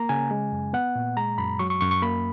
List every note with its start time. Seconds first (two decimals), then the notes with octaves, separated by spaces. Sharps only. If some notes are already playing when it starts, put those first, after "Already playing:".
Already playing: A#3 A#5
0.09 C#3 G#5
0.31 G#3
0.52 F#2
0.73 B3 F#5
0.96 A#2
1.17 G#3 A#5
1.38 F#2 B5
1.59 F#3 C#6
1.70 C#6
1.81 F#2 C#6
1.91 C#6
2.02 A#3 B5